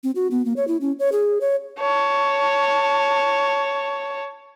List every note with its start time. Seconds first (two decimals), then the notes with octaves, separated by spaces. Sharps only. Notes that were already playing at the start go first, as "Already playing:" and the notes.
0.04 C4
0.16 F#4
0.31 B3
0.45 A#3
0.57 C#5
0.68 E4
0.81 C#4
0.99 C#5
1.12 G#4
1.41 C#5
1.79 C#5 A5